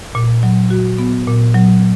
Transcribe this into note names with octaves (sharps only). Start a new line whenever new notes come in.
A#2
F#3
F#4
B3
A#2
F#3